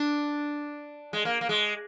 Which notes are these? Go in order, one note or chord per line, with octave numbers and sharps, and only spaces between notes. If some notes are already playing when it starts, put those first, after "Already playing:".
Already playing: D4
G#3
A#3
A#3
G#3